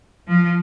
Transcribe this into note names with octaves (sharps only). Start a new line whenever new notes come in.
F3